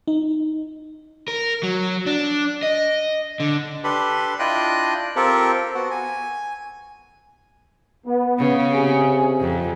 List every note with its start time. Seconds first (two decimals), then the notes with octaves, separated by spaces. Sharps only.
0.08 D#4
1.28 A#4
1.63 F#3
2.06 D4
2.63 D#5
3.40 D3
3.84 D4 G4 A4 B4 B5 C6
4.39 D4 E4 F4 D#5 G5 F#6
5.16 C4 F4 G4 A4 A#4
5.75 B3 F#4
5.91 G#5
8.06 B3
8.39 C#3
8.73 C3 G#4
9.40 F2